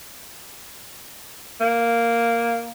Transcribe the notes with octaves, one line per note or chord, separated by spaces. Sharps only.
A#3